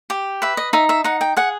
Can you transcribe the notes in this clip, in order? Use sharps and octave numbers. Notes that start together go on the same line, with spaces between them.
G4
B4 E5
D#5
D#4 E5
E5
D#4 F#5
G5
G#4 F#5